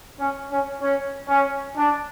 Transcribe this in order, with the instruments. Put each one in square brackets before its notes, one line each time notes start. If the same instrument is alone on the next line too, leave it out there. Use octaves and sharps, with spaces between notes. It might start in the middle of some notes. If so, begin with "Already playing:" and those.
[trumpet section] C#4
C#4
C#4
C#4
D4